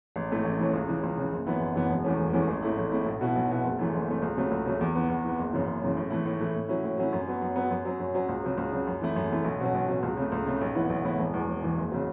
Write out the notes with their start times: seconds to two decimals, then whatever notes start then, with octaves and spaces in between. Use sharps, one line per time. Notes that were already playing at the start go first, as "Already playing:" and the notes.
0.16 A1
0.30 A2 E3 A3 C#4
0.44 A1
0.59 A2 E3 A3 C#4
0.74 C#2
0.88 C#3 E3
1.03 C#2
1.17 C#3 E3
1.32 F#1
1.47 F#2 E3 B3 E4
1.61 F#1
1.75 F#2 E3 B3 E4
1.90 E1
2.04 E2 E3 A3 C#4
2.19 E1
2.33 E2 E3 A3 C#4
2.48 A1
2.63 A2 A3 E4
2.77 A1
2.92 A2 A3 E4
3.06 B1
3.21 B2 B3 E4
3.35 B1
3.50 B2 B3 E4
3.64 F#1
3.79 F#2 E3 A3
3.94 F#1
4.08 F#2 E3 A3
4.22 C#2
4.37 C#3 F#3 A3 C#4
4.51 C#2
4.66 C#3 F#3 A3 C#4
4.81 E2
4.95 E3 B3
5.09 E2
5.24 E3 B3
5.39 F#1
5.53 F#2 C#3 E3
5.67 F#1
5.82 F#2 C#3 E3
5.97 A2
6.10 E3 A3 E4
6.26 A2
6.40 E3 A3 E4
6.55 A2
6.69 F#3 C#4 E4
6.84 A2
6.98 F#3 C#4 E4
7.12 F#2
7.28 F#3 B3
7.42 F#2
7.56 F#3 B3
7.71 F#2
7.85 F#3 C#4
8.00 F#2
8.14 F#3 C#4
8.29 C#2
8.44 C#3 F#3
8.58 C#2
8.73 C#3 F#3
8.87 F#2
9.01 E3 A3 E4
9.16 F#2
9.31 E3 A3 E4
9.44 B1
9.60 B2 F#3 C#4
9.74 B1
9.88 B2 F#3 C#4
10.03 C#2
10.17 C#3 A3
10.32 C#2
10.47 C#3 A3
10.61 B1
10.75 A2 E3 B3 E4
10.90 B1
11.04 A2 E3 B3 E4
11.19 E1
11.33 E2 E3
11.48 E1
11.63 E2 E3
11.77 F#1
11.92 C#3 F#3